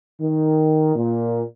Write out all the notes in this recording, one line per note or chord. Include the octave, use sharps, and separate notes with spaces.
D#3
A#2